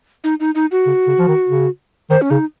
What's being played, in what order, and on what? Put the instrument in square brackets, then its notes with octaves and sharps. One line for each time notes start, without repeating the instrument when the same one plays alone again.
[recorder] D#4
D#4
D#4
F#4
[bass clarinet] C#3
C#3
F3
D#3
C#3
[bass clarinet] D#3 [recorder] C5
[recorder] C#4
[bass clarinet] C#3 [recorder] D#4